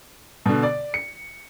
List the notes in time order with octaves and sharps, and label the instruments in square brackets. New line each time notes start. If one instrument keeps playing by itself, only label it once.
[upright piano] B2 D3
D5
C#7